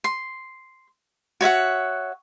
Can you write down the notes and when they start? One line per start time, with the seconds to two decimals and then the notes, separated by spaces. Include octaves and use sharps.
0.04 C6
1.41 F#4 C#5 E5 F#5